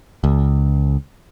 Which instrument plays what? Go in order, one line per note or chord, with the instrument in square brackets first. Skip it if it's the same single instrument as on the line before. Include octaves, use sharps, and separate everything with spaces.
[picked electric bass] C#2